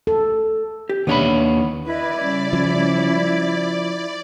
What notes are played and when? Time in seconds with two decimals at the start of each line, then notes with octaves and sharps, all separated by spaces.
0.07 A4
0.89 G4
1.07 D#2 B3 D4 C#5 E5 B5
1.86 E4 B4 D5 D#5
2.19 C#3 G3 C#4
2.53 F3